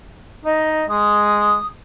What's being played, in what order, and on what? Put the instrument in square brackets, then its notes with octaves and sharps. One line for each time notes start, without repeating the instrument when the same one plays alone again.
[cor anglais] D#4 [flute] D#5
[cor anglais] G#3 [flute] D#6